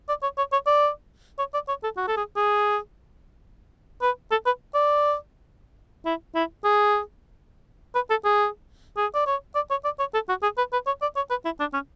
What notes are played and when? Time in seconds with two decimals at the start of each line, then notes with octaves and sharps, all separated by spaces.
0.09 D5
0.23 C#5
0.38 C#5
0.52 C#5
0.66 D5
1.39 C#5
1.54 D5
1.68 C#5
1.84 A4
1.97 F#4
2.08 A4
2.17 G#4
2.37 G#4
4.02 B4
4.31 A4
4.46 B4
4.74 D5
6.05 E4
6.35 E4
6.64 G#4
7.95 B4
8.10 A4
8.24 G#4
8.97 G#4
9.15 D5
9.27 C#5
9.55 D5
9.71 C#5
9.84 D5
9.99 C#5
10.14 A4
10.29 F#4
10.43 G#4
10.58 B4
10.73 B4
10.87 C#5
11.02 D5
11.16 C#5
11.30 B4
11.45 E4
11.60 D4
11.74 C#4